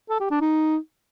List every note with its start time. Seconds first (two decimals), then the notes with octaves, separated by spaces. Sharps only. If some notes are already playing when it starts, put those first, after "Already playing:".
0.10 A4
0.21 G4
0.31 D4
0.41 D#4